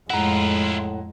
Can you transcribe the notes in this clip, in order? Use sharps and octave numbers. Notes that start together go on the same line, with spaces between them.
F2 A2 G#3 E4 F4 F#5 A#5